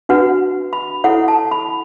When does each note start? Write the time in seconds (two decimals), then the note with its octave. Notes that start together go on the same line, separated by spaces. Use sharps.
0.09 D4 F#4 B4 F#5
0.73 B5
1.04 E4 A4 C#5 F#5
1.28 A5
1.52 B5